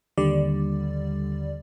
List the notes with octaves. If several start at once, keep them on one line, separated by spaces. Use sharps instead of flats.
D#2 D3 G3 D5